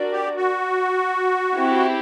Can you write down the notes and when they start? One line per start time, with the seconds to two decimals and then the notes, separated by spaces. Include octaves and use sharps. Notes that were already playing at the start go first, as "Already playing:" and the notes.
Already playing: D4 F#4 A#4 D5
0.12 G4
0.37 F#4
1.54 C4 E4 G4